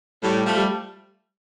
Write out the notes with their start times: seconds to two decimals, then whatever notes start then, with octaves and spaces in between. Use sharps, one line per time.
0.23 A2 G3
0.45 F3 A3
0.56 G3